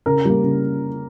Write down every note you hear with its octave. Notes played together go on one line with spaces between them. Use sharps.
C#3 A#4
G3 A#3
C#3